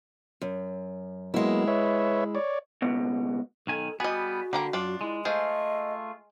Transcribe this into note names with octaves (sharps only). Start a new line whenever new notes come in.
F#2
F#3 G#3 A#3 B3 E4
B4 C#5 E5
C#5 D5
C#2 B2
B1 D#3 A4 G#5
G3 B3 F#4 G#4 D#5
D3 G3 A#3 A#5
F#2 D4 F4
G#3 E4
G#3 A3 F4 G#4 C5 D#5